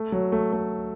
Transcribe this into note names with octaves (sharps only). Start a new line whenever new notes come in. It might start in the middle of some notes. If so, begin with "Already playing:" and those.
Already playing: A3
F#3
A3
A3